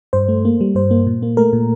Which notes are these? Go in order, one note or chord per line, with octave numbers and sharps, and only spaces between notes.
G2 C5
A3
A#3
G3
G2 C5
A#3
A#2
A#3
A3 A#4
A#2